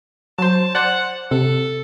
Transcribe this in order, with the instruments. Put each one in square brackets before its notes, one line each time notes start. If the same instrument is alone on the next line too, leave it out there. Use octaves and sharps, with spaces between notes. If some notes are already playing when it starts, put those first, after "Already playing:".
[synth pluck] F#3 C5 [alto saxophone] A5
[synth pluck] C5 D5 [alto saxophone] F#5
[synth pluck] C3 [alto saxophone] A4